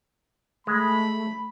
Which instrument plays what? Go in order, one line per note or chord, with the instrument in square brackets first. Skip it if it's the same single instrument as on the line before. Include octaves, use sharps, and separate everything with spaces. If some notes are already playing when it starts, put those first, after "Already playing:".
[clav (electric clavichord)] G#3 [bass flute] A3 [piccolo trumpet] B5